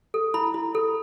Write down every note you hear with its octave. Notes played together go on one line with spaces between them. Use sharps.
A4
E4 B5
E4
A4